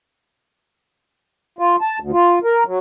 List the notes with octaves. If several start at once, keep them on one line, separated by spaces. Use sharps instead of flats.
F4
A5
D2
F4
A#4
F#3